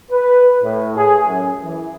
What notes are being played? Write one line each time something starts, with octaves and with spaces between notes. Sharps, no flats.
B4
A2
G#4
F#2
E3